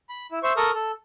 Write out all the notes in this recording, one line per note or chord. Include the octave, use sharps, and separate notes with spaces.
B5
E4
C5 E5 C#6
A4 A#4 C#6 D#6 F6
A4